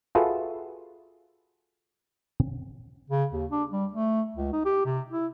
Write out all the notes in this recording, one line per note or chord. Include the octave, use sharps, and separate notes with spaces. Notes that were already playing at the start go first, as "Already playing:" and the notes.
F4 F#4 G#4 A4 B4 E5
C#3
D#2
D4
G3
A3
C#2
D#4
G4
C3
E4